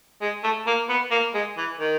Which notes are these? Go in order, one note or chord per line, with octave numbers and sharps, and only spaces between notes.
G#3
A3
A#3
B3
A#3
G#3
E3
D#3